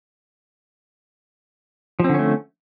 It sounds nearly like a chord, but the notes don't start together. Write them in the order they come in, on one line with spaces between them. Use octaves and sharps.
F3 C4 D3 C#4 A3